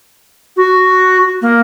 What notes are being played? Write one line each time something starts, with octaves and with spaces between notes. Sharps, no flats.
F#4
A#3